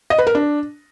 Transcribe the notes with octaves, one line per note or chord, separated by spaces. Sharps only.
D#5
B4
A#4
D4